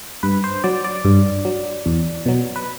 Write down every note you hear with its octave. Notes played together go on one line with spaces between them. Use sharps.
G2 B4
C5
F#3 D5
D5
G2
F#3
E2
B2 F#3
B4